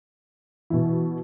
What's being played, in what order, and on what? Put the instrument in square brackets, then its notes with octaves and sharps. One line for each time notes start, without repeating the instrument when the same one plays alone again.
[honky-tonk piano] B2 E4 [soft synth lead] E3